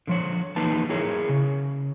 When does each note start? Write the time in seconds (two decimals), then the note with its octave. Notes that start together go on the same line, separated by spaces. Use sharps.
0.07 D3 F3 C#5
0.56 E3 A#3 D#4 B4 A5
0.90 E4 G#4 A#4 C#5
1.29 C#3